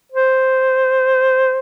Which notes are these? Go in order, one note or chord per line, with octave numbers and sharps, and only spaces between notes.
C5